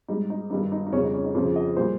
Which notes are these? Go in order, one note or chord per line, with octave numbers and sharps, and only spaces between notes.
G#2 G3 D#4
D#4
G2 D#3 G3 D#4
D#4
D#4
F2 C#3 G3 C#4
D#4
C#4
D#4
F2 C#3 F3 F4
D#5
A#2 G3 C5